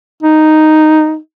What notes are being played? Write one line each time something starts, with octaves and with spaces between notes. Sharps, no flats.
D#4